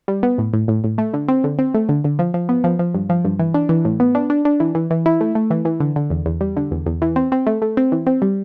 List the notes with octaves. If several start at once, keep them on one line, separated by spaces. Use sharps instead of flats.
G3
B3
A2
A2
A2
A2
A3
D3
C4
D3
C4
A3
D3
D3
F3
F3
B3
F3
F3
G2
F3
G2
E3
D4
E3
A2
B3
D4
D4
D4
E3
E3
E3
E4
A3
A3
E3
E3
D3
D3
E2
E2
G3
D3
E2
E2
E3
C4
C4
A3
A3
C4
E3
C4
G3